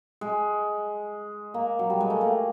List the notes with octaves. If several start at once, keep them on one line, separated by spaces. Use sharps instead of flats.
G#3
A#3
F#3
G3
G#3
A3
A#3